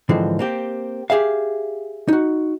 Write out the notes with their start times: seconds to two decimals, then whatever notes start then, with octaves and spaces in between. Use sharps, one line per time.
0.09 G#2 D3 E3 F3 C4
0.39 A#3 C4 G4
1.10 G4 G#4 E5 F5
2.08 D#4 F#4